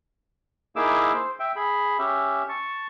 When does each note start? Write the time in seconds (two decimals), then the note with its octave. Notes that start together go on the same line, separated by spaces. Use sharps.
0.76 A#3 D#4 E4 G#4 D6 E6
1.14 C5
1.40 E5 G5
1.56 G#4 B5
1.99 C#4 G4 E5
2.49 A5 C#6